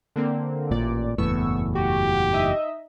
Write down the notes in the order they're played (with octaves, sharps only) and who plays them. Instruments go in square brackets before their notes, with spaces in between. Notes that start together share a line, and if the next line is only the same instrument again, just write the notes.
[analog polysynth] D3 A#3 C4
[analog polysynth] A1 D5 [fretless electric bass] A#2
[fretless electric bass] F#1 E2 A2 [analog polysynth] B3 C#6 E6
[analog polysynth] F#4 [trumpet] G4
[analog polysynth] D#4 D#5 E5